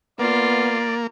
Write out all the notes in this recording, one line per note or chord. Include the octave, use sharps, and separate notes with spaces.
A#3 B3 F4 D5